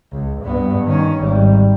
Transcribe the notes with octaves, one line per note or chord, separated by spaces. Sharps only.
C#2
G2 B3
D#3 C#4
G#1 G3